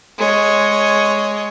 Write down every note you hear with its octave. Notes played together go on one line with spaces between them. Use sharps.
G#3 C#5